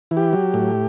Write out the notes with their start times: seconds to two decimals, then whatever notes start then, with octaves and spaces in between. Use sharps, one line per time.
0.11 E3
0.17 G4
0.33 F#3
0.54 A2